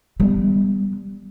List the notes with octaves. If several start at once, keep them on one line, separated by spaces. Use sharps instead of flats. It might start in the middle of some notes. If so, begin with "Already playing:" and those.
G3 B3